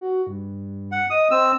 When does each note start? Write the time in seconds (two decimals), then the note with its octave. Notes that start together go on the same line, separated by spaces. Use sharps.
0.01 F#4
0.27 G2
0.92 F#5
1.10 D#5 D#6
1.31 C4 E6